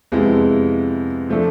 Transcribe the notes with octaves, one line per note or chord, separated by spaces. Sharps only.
F2 C3 G#3 B3 E4
F3 A3 D4 A4